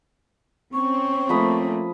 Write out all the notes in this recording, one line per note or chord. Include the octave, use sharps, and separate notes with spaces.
C4 C#4 C#6
F3 A3 A#3 B5 D#6